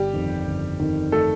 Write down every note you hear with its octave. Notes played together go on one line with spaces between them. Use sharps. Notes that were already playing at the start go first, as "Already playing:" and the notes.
Already playing: G1 G3 G4
F2 D#3
G1
F2 D#3
A3 A4